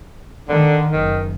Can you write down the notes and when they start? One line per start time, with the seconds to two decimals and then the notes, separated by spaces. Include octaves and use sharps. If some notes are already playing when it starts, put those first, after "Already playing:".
0.49 D3 D#3
0.91 F#1 D#3